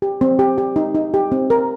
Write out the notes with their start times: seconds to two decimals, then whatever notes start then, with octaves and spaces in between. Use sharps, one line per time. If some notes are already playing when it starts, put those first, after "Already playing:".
0.02 G4
0.21 C4
0.39 G4
0.58 G4
0.76 D#4
0.95 D#4
1.14 G4
1.32 C4
1.50 A#4